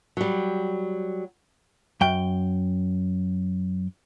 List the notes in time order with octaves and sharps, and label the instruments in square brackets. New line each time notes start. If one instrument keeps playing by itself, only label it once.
[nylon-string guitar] F#3 G3
[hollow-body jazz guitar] F#2 G5